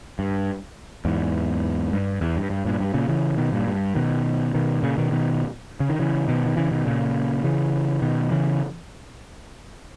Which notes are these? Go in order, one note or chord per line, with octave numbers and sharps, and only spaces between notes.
G2
E2 G#2
G2
E2
G2
G2
G2 A#2
G2
A#2 C#3
C#3 E3
B2 D#3
G2 A#2
G2
B2 D#3
B2 D#3
A#2 C#3
B2 D#3
B2 D#3
C#3
D#3
C#3 E3
B2 D#3
D#3
C#3 E3
B2 D#3
A#2 C#3
C#3 E3
B2 D#3
C#3 E3